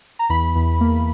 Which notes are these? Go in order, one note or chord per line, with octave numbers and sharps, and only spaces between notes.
A#5
E2 B5
E2
A#3